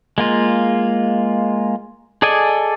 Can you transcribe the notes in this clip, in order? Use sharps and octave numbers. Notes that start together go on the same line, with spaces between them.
G#3 A#3 F4
G#4 A4 D5 D#5 G#5